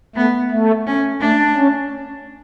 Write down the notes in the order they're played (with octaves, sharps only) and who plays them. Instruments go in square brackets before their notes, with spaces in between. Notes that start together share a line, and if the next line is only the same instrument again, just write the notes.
[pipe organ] A3 [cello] B3
[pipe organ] A3
[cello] C#4
[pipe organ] A3 [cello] D4
[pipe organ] C#4